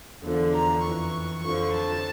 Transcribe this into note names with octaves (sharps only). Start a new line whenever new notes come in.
E2 D3 F3
A#5
F2 E3 C#6
C#6
F2 D3 F3 C#6
A5